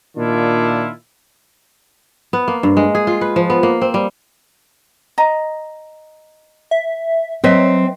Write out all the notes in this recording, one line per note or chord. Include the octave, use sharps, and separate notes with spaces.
A#2 D#3 D4 E4 F4
B3
A#3
G2
G#3
G#4
F4
B4
F3
B3
A#3
C4
G3
D#5 A#5
E5
F#3 C4 B4 D#5 E5